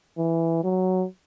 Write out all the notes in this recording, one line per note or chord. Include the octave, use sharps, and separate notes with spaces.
E3
F#3